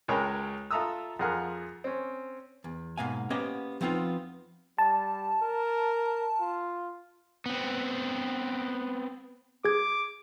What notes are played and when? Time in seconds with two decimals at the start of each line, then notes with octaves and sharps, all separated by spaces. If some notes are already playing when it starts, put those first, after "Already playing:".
0.08 C#2 G#3 A#4 C#5 G5 B5
0.71 F4 A4 E5 A#5 D#6 E6
1.19 F2 F4 G#4 A#4 F#5 F6
1.84 C4 C#4
2.64 E2
2.98 G#2 B2 A#3 F5 G#5
3.30 A#3 B3 C#4 G4 C5 D#5
3.81 F3 B3 C4 D#4 F4
4.78 G3 A5
5.42 A#4
6.40 F4
7.46 B3 C4
9.65 G#4 D6 G#6